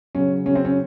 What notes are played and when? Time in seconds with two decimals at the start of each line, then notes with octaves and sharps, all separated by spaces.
0.15 C#3 F#3 C#4
0.45 C#3 F#3 C#4
0.55 C4
0.65 C#4